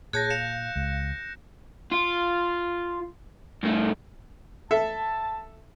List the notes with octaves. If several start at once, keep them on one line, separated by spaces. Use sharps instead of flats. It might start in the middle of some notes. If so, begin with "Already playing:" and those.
A#2 G#4 C#5 A5 F#6 G6 A#6
F5 C#7 E7
C#2 G#3
F4
G2 A3
A4 E5 A5